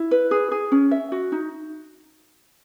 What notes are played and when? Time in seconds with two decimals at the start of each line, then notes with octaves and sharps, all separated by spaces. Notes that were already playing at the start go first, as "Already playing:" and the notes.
Already playing: E4
0.11 B4
0.31 G#4
0.51 G#4
0.72 C#4
0.91 E5
1.12 F#4
1.32 D#4